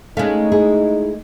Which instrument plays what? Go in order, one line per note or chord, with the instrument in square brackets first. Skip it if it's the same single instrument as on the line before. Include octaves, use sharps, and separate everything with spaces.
[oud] G#3 A3 [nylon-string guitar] C#4 F5 [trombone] D#4
[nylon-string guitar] E4 G#4